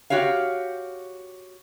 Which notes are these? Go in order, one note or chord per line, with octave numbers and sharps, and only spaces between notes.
F#4 G4 C#5 F5